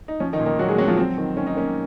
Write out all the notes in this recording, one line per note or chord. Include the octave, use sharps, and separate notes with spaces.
D#4
F3 C#4
D#3 D#4
A#2
D#3 D#4
A#2 F#3 F#4
G#3 G#4
F#3 C4 F#4
F3 F4
F#3 C4
D#3
D#3 C#4
D#4
A#3 C#4